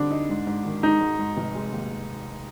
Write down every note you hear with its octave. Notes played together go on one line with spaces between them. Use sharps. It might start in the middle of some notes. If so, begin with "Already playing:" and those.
Already playing: D3 G3 C4 D4 D#4
D#4
G#2
G#2
D#3
G#3 D#4
G#2
G#2
F1
G#3
D#2